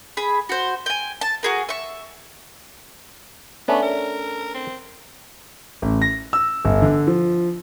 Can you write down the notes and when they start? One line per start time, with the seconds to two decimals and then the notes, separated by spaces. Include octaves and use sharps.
0.17 G#4 B5
0.49 F#4 C5
0.86 G5 G#5
1.21 A5
1.43 F#4 G#4 A#4
1.69 E5 C#6
3.68 A3 B3 C#4 D4
3.82 A#4
4.55 C4
5.82 A1
6.02 A#6
6.33 E6
6.65 G1
6.82 D3
7.07 F3